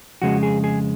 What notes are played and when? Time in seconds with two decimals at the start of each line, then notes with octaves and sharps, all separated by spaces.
0.22 F2 C#3 G#3 F#4
0.43 G#4
0.64 G#4